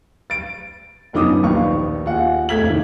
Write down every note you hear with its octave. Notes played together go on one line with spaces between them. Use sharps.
A6 D7
A1 F#2 B3 D#4 D6 D#6
A#1 D#2 D#3 B4 F5 C#6
D#2 F4 G#4 F#5
F1 A2 A3 G#6 B6 F#7
D#3 A#3